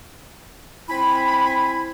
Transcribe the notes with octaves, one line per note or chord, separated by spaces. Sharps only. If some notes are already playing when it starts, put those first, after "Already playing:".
C4 E4 G#5 B5